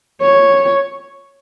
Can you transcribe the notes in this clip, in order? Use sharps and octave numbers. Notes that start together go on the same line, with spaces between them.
C#5